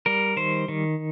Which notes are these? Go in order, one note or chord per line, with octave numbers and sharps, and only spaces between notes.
G3 A#4
D#3 C5
D#3